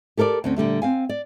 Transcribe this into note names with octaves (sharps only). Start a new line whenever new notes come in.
G4 A4 A#4 C#5 D5
D2 C4 C#4
A#2 D3 G3 A3
C4 F5 G#5
D5